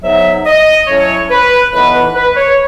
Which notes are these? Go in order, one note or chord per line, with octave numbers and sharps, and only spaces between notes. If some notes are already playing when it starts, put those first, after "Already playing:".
G#2 F#3 B3 D#4 E5
D#5
A2 F#3 C#4 C#5
B4
A2 E3 B3 D#4 B4
B4
B4
C#5